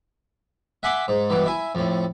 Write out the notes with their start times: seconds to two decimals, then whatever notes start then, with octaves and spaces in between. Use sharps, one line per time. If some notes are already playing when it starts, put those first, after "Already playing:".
0.83 E5 F#5 G#5 B5 C6 D6
1.08 G#2
1.30 G2 B2 E3
1.46 E4 G#5
1.75 F2 A2